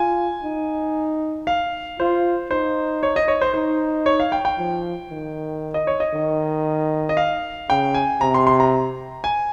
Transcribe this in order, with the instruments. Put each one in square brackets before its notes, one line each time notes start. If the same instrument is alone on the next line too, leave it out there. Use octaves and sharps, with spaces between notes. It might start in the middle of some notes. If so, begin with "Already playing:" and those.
Already playing: [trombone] F4 [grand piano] G#5
[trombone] D#4
[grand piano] F5
[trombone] F4 [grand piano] C5
[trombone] D#4 [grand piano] C5
[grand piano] C#5
D#5
C#5
C5
[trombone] D#4 [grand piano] C5
[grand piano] C#5
F5
G5
G5
[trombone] F3
D#3
[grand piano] D#5
C#5
D#5
[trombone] D#3
[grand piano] D#5
F5
[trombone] C#3 [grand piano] G5
[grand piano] G#5
[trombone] C3 [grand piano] A#5
[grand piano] C6
C6
A#5
G#5